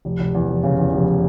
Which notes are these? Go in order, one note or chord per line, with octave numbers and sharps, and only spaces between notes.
F1
F1
E2
F1
C#3
E2
F1